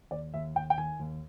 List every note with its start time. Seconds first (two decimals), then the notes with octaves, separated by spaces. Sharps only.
0.11 D#2 D5
0.34 D#2 E5
0.55 D#2 G5
0.70 G5
0.78 D#3 G#5
0.99 D#2